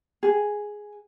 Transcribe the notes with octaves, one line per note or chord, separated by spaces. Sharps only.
G#4